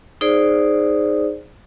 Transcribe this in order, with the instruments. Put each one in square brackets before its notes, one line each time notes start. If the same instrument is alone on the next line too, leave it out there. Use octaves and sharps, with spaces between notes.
[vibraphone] D#4 G#4 C5 D5